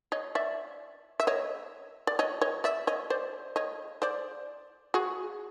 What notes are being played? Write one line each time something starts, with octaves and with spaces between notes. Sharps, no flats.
C#5 D#5
D5 E5
E5
C#5 D#5
D5
C#5 D#5
C#5 D#5
D5 E5
C#5 D#5
C5 D5
C#5 D#5
C5 D5
F#4 G#4